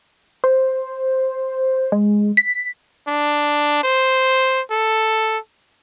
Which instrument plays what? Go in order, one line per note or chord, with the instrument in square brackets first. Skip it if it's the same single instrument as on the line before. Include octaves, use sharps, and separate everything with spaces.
[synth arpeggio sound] C5
G#3
B6
[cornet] D4
C5
A4